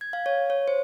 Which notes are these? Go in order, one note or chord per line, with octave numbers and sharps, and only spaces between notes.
G#6
F5
C#5
C#5
C5